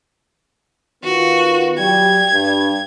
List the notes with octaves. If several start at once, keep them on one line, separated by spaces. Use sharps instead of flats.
D#3 B3 F4 F#4
F#3 G3 G5 G#6
G2